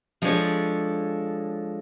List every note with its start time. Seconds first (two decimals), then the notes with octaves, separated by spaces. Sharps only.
0.22 F3 G#3 D4 A4 C#5